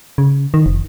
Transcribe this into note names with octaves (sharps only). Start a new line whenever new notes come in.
C#3
D#3
F1